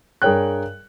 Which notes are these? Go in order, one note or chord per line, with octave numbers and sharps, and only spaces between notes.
G2 G#4 A#4 C#5 G5 F#6